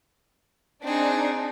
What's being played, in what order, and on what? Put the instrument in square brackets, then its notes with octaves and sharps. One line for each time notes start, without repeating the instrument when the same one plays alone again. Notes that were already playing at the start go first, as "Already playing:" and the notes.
[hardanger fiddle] C4 G#4 [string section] D4 D#4